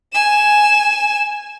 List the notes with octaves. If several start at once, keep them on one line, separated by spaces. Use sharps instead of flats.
G#5 E7